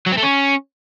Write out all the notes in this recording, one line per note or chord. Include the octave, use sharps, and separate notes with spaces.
F#3
C4
A3
C#4